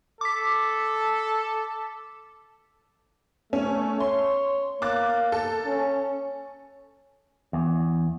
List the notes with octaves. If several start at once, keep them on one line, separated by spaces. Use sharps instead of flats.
A4 D6 B6
A3 C#4
C#5 C6
A#3 D6 F#6 A6
A4
C#4
E2